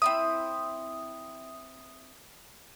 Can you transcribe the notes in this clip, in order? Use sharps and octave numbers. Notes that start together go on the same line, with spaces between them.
C4 E4 E5 D#6